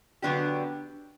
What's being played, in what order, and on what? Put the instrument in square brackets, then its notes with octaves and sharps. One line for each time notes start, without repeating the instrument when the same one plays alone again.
[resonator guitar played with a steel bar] D3 F#3 B3 D4 G4